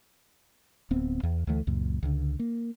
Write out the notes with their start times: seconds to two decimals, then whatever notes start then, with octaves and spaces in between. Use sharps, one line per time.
0.91 D1 B3 C4
1.23 E2
1.47 D2 E3 A3
1.67 C#2 F#2 A#2
2.03 C#2 D3
2.39 A#3